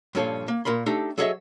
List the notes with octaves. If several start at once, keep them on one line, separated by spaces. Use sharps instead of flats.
G2 A#2 F3 C#4 A4 C#5
A#3
A#2 A#4 B5 C6
A3 D4 D#4 G4 A4
F#3 G#4 A4 C#5 D#5 E5